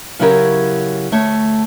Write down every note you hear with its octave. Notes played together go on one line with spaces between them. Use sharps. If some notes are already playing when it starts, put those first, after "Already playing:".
C#3 F#3 C#4 E4 G4 A#4
D2 A3 C#5